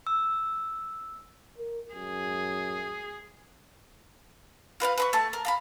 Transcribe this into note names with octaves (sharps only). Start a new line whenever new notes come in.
E6
A#4
F#2 G#4
F4 B4 D5 F5
B4 B5 C#6
A3 A5
A#4
F5 A#5 B5